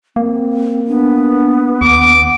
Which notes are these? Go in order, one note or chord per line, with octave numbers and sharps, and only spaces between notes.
A#3 C4
B3 D4
D#2 F#5 D6